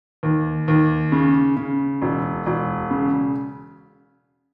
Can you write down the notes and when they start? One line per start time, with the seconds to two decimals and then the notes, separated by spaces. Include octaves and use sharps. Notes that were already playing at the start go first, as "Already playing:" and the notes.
0.23 D#2
0.68 D#2
1.12 C#3
1.56 C#3
2.02 E1
2.46 E1
2.91 C#3